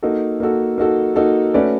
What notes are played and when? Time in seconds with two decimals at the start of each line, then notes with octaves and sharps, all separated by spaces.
0.03 A#3 D#4 F#4 A4
0.40 A#3 D#4 F#4 A4
0.78 A#3 D#4 F#4 A4
1.16 A#3 D#4 F#4 A4
1.54 A3 C#4 F#4 B4 D5